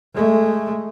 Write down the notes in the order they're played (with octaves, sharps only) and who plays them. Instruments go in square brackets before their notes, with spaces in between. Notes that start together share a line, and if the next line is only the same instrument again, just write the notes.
[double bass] G#3 A3